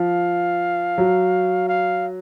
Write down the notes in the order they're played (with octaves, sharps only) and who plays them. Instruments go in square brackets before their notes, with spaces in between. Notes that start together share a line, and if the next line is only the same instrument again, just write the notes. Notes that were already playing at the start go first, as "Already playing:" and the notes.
Already playing: [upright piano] F3 [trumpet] F5
[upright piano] F#3
[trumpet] F5